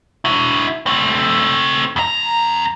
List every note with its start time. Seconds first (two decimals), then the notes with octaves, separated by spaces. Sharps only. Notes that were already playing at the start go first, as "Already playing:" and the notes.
0.25 E4 F#4
0.86 A3 C4
1.96 F2 A#5